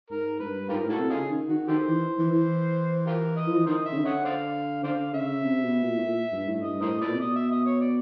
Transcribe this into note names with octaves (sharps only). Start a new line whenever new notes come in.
G#2 A#4
G2 B4
G#2 F4 G4 A#4
A2
E4 F#4 A4
C3
C#3 D#4 F4 G#4
D#3
D#3 F#4
D#3 G4 A4 C5
E3
E3
E3
F4 G4 A#4
D#5
F3
E3
D#3 A#4 C5 D#5
E5
C#3
D3
C#5 D#5 F#5
C5 D5 F5
D3 C5 D5 F5
C#3 E5
C3
B2
A#2
A2
A#2
G2
A2
G2 D#5
A2 A#4 C5 D#5
A#2 A4 B4 D5
C3
B2 D#5
E5
D#5
C#5
D5